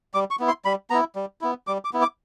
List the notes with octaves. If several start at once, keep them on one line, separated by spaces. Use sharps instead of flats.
G3 D6
C#6
B3 E4
C6
G3 B5
B3 E4 A#5
G3
B3 E4
G3 D6
D6
B3 E4
D6